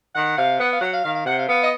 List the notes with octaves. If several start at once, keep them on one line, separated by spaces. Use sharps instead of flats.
D#3 F#5
C3 F5
B3 F#5
F5
F#3 F#5
F5
D#3 F5
F5
C3 F#5
F5
B3 F5
D#5